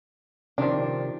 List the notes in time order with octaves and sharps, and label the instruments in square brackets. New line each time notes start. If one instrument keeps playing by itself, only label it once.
[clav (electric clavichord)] C3 D#3 C4 [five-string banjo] F3 D4